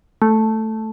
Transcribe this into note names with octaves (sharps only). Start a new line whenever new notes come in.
A3